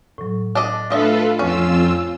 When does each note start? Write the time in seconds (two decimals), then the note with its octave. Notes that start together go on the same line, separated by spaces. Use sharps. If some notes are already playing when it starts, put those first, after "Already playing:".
0.18 A2 F#3
0.55 D4 D#5
0.90 F3 A3 D4 F4 A4 B4 D#5 E5
1.39 F2 C#4 F4 E6